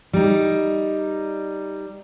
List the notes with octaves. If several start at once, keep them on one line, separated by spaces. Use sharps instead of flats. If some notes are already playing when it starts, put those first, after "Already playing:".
G3 D#4